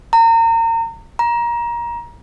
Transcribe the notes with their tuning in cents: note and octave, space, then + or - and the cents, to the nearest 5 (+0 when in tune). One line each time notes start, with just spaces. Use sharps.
A#5 -35
A#5 +25